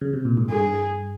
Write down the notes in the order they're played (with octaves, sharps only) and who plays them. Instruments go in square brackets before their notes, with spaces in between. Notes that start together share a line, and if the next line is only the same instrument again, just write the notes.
[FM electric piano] C#3
C3
A#2
G#2
[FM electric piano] G2 [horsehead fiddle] G#4